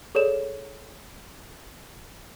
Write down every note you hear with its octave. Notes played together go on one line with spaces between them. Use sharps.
G#4 A4 C#5 D5 E7